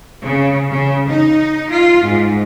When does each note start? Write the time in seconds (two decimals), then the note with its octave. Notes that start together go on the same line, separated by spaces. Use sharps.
0.23 C#3
0.69 C#3
1.08 D#4
1.70 F4
2.07 G#2